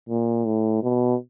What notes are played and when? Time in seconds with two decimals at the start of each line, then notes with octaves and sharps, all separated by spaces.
0.09 A#2
0.45 A2
0.83 B2